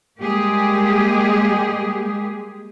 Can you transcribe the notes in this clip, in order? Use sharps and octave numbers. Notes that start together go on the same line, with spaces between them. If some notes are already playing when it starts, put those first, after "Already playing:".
G3 G#3 A#3 G4 G#4